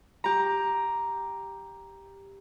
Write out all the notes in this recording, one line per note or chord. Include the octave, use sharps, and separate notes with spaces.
G4 A#5